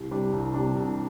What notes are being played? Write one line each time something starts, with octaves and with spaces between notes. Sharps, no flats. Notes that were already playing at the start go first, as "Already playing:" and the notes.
Already playing: C2
C3 G3 D4
C2
C3 G3 D4
C2